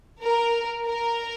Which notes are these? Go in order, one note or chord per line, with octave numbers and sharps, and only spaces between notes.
A#4
A#4